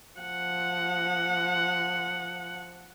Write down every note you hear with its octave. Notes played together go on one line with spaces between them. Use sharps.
F3 F#5